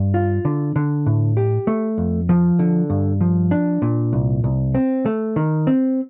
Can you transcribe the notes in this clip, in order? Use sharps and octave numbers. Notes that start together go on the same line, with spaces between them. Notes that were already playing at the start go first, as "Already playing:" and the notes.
Already playing: G2
F4
D3
D3
A2
G4
A3
F2
F3
D3
G2
F3
D4
A#2
C2
C2
C4
A3
D#3
C4